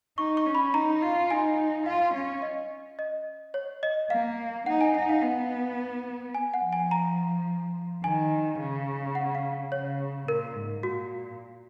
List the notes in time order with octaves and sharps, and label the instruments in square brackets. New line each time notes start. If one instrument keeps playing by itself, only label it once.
[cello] D#4 [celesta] C#6
[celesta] C#6
[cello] C#4
[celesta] B5
[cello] D#4 [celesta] A#5
[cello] F4
[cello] D#4 [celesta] G#5
[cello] F4 [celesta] F5
[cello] C#4
[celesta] D#5
D#5
C#5
D#5
[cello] A#3 [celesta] F5
[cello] D#4 [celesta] F#5
[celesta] G#5
[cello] D#4 [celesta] F#5
[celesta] F5
[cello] B3 [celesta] F#5
[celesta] G#5
F#5
[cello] F3
[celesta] G#5
A#5
[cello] D#3 [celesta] G#5
[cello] C#3
[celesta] F#5
F5
[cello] C#3 [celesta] C#5
[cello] A#2 [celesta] A#4
[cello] G#2
[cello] A#2 [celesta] F#4